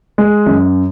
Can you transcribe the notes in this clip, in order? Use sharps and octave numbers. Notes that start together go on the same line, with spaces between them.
G#3
F#2